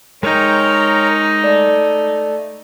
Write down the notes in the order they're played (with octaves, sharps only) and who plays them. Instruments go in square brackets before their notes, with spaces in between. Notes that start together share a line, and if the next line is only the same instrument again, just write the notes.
[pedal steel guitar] G#3 G5 [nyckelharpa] D#4 [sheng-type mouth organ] A#4 C#5 A#5
[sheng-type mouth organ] A3 [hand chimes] D5